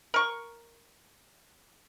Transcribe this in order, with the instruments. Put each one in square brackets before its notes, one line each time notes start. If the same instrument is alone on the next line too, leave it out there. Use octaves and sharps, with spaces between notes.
[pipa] A#4 C#6